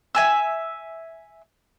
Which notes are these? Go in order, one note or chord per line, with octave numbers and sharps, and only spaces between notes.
E5 G#5 E6